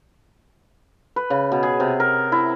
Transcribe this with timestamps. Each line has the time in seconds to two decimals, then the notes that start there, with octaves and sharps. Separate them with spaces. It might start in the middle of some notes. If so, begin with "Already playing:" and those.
1.16 B4
1.30 C#3
1.52 B2
1.63 G#4
1.80 C3
2.00 A#4
2.32 E4